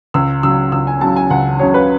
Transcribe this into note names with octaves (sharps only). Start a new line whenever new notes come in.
C#2 E6
C#3 F#3 E6
C#2 E6
G#5
C#3 F#3 A5
G#5
C#2 F#5
C#3 F#3 C#5
B4